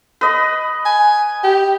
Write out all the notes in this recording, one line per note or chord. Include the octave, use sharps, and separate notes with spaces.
B4 D#5
G#5
G4